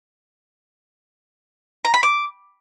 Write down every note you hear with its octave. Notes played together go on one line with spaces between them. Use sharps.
A#5
B5
D6